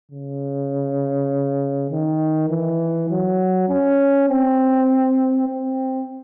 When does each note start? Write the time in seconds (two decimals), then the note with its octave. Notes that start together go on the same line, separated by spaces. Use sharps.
0.11 C#3
1.91 D#3
2.50 E3
3.10 F#3
3.69 C#4
4.29 C4
5.48 C4